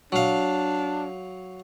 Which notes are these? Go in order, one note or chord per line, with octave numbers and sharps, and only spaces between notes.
F#3 D4 F5